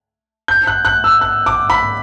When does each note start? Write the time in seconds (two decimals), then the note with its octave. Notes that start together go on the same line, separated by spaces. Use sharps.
0.48 G6
0.67 F#6
0.85 F#6
1.04 E6
1.21 F#6
1.46 D6
1.70 B5